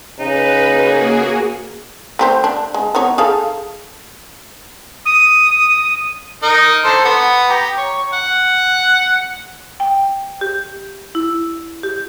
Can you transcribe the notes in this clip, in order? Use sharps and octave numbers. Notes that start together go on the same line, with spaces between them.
C#3 D#4 B4
A#3 F#4 G#4
A3 G4 C5
D4
G#3
B3 D#4 C#5
G#4 A4 F5
D#6
D#4 A#4 D#5
D3 A4 C5
B3
G4 A#5
C#5
F#5
G5
G4
E4
G4